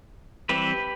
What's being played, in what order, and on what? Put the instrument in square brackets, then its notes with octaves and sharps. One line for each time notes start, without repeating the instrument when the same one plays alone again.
[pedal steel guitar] E3 G3 C4 G4 B4